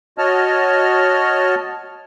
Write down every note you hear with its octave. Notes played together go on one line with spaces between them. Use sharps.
F#4 C#5 D#5 A5 F6